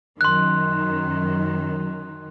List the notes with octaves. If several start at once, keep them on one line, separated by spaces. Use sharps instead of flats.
F#2 D#3 C6 F#6